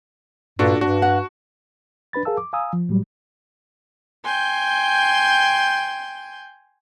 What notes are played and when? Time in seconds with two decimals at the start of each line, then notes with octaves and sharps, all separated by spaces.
0.59 G2 A#2 D4 F#4 A4
0.81 G2 D4 F#4
1.02 F#5
2.13 D4 B4 B5 A6
2.25 G#4 A#4 F5 A5 E6
2.37 D6
2.53 F5 G#5 A#5 D#6 E6
2.73 F3
2.89 A2 F#3 G3
4.25 G5 G#5 C6 G6